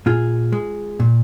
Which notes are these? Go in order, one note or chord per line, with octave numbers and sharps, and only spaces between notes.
A#2 F4 G#4
G#3
A#2